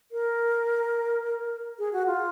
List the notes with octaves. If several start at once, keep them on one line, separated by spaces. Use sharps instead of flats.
A#4
G#4
F#4
F4